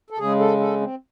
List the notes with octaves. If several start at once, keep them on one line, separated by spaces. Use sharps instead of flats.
A4
C#3 G#3 G#4
A4
A4
C4